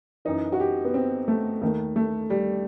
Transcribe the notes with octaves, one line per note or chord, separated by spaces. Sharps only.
F#2 E3 D#4
F#4
G4
B3
C4
A3
D#2 D#3 A3
A3
G3